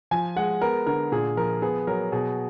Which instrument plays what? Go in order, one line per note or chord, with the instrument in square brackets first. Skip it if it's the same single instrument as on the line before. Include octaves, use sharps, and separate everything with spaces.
[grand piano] F3 G#5
G#3 F#5
B3 A#4
D3 A#4
A#2 G#4
F3 A#4
B3 G#4
F#3 A#4
B2 G#4